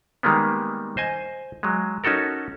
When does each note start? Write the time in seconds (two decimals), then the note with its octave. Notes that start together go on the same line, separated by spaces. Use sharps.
0.23 D#3 G3 G#3 A#3 B3
0.97 C5 D#5 G#5
1.63 F#3 G#3
2.04 C#4 D#4 F#4 A4 A#4